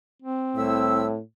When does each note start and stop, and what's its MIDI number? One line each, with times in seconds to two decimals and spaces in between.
0.22 1.16 60
0.56 1.06 36
0.56 1.19 45
0.56 1.06 76
0.56 1.06 88